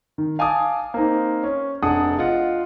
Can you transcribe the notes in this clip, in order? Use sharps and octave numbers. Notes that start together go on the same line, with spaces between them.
D#3
F5 G#5 A5 D6 D#6
A#3 C4 D#4
C#4
F1 D4 G#4 F#5 D#6
F4 D#5 F#5